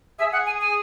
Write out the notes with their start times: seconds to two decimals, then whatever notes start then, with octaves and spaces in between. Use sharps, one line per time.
0.19 G#4 E5
0.32 F#5
0.46 G#5
0.61 G#5